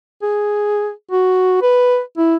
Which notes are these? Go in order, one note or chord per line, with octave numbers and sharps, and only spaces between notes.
G#4
F#4
B4
E4